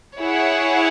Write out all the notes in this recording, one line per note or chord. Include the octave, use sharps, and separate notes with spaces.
E4 G#4 C#5 F#5